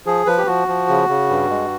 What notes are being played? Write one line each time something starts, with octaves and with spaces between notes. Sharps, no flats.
F3 G#4
F3 B4
G4
F3 F#4
F3
C#3
C#3
G2
G#3